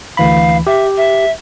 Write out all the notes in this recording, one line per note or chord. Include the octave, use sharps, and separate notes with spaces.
D2 E3 F5 B5
G4 E5
E5